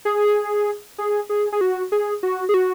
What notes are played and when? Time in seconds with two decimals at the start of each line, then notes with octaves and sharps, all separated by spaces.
0.05 G#4
0.98 G#4
1.29 G#4
1.52 G#4
1.61 F#4
1.92 G#4
2.23 F#4
2.49 G#4
2.54 F#4